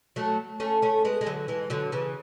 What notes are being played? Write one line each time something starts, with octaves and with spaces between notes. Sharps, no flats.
F#3 A3
A3 C#4
A3 C#4
G#3 B3
G#3
D3 F#3
E3 G#3
D3 F#3
C#3 E3